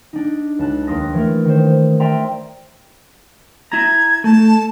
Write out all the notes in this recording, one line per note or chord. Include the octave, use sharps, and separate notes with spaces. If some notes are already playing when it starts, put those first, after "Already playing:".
D4 D#4
C#2 A5 F#6
D#2 A#3 C6 D#6 A#6
E3 A3 A#4
D#3 C5
A#4 D5 E5 G5 A#5 C6
E4 A#5 G#6
A3 A5